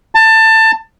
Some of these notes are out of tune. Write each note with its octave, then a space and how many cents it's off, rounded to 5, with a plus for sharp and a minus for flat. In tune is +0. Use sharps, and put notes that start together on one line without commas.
A5 +20